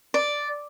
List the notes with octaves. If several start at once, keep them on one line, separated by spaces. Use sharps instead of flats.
D5